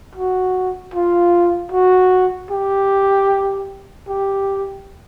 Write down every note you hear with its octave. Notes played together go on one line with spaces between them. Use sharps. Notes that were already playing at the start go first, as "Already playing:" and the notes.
F#4
F4
F#4
G4
G4